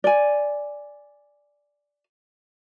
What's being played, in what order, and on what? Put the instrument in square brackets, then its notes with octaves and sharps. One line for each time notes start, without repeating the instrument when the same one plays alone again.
[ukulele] D5 G#5